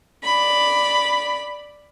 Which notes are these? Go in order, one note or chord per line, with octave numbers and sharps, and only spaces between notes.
D5 B5